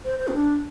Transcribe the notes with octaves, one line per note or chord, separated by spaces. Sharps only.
C5
C5
C4
D4